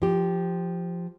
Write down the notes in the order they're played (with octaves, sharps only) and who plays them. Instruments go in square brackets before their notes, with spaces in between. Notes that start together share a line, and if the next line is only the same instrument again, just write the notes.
[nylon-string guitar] F3 G4